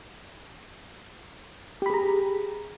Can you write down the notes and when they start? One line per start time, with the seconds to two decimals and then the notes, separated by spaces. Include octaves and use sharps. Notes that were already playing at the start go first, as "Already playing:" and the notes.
1.82 G4
1.86 B5
1.90 G#4
1.94 A#5